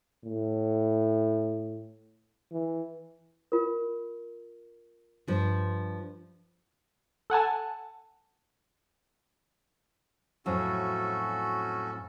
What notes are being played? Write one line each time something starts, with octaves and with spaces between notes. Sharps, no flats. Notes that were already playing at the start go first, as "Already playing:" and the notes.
A2
E3
F4 A#4
G2 F3
A4 F#5 G#5 A5
F2 A2 F#3 C#4 F#4 A4